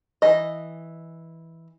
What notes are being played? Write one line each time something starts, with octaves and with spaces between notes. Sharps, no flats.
E3 D#5